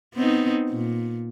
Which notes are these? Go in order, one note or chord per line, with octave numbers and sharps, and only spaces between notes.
B3 C4 D#4
A#2